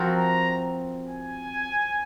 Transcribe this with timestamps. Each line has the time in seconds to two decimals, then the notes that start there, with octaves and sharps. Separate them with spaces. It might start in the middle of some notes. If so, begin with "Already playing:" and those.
Already playing: F3 C4 F#4 A#4
0.18 A#5
1.09 G#5